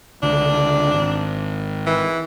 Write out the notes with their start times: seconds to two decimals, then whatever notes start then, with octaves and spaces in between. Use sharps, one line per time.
0.23 C#2 D3 D4
0.92 G#1
1.87 E3